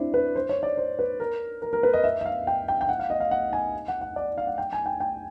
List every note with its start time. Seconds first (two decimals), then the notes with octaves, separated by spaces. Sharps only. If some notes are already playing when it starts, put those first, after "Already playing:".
Already playing: C4 D4 E4
0.14 B4
0.36 C5
0.49 C#5
0.63 D5
0.78 C5
0.99 B4
1.20 A#4
1.62 A#4
1.73 A#4
1.83 B4
1.94 D#5
2.04 E5
2.21 E5
2.26 F5
2.47 G5
2.68 G5
2.81 G5
2.89 F#5
2.99 F5
3.10 D#5
3.20 F5
3.31 F#5
3.53 G#5
3.88 F#5
4.01 F#5
4.16 D5
4.38 F5
4.47 F#5
4.58 G5
4.73 G#5
4.86 G5
5.00 G5